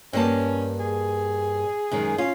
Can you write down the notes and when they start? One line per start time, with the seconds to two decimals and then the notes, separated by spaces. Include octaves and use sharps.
0.13 G2 A#3 C#4 A5
0.80 G#4
1.91 F#2 D#3 G#3
2.18 C#4 F4